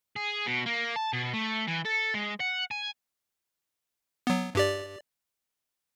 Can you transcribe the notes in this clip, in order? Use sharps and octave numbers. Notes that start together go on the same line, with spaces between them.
G#4
B2
A#3
A5
B2
A3
E3
A4
G#3
F#5
G#5
F#3 B3
G2 G4 D5